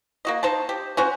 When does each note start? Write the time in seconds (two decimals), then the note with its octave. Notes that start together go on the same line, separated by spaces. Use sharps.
0.25 A#3 F#4 D#5
0.43 D#4 C5 A5
0.69 G4
0.97 C#4 F#4 C5